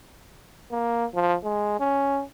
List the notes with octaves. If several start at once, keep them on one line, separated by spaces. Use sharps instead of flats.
A#3
F3
G#3
C#4